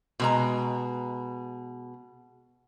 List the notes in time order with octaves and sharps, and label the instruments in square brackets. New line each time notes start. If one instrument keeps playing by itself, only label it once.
[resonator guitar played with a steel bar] B2 G#3 A#5